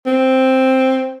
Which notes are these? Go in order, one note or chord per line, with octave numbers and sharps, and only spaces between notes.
C4